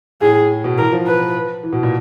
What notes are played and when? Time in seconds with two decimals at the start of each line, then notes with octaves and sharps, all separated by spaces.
0.21 A2 G#4
0.64 B2
0.78 E3 A#4
0.93 F3
1.07 B4
1.63 E3
1.73 B2
1.83 A#2